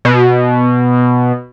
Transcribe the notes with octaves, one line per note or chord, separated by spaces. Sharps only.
B2